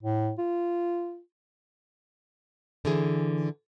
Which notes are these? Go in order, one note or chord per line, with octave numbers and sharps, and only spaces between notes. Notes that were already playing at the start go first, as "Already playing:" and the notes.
A2
F4
D3 E3 G#4